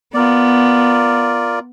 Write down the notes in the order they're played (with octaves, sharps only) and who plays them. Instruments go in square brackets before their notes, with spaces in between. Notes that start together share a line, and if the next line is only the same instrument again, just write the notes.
[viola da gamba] B3 [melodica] F4 A#4 D5